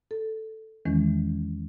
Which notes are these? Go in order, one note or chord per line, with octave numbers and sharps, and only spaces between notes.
A4
E2 D#3 E3 G#3 C#4